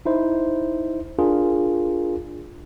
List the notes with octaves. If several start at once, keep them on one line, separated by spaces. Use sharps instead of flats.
D#4 E4 C5
D4 F4 G#4 A#4